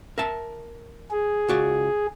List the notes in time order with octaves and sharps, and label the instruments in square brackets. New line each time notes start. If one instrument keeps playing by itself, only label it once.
[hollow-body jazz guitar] A#4 E5 A5
[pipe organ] G#4
[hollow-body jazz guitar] C#2 F#4 D5